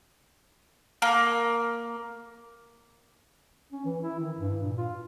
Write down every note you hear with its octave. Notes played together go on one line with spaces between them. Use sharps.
A#3
C#4
E3
E4
D#3
G2
A#2
F4